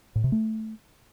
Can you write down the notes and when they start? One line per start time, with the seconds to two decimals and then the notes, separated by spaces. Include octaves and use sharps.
0.15 A2
0.24 C3
0.32 A3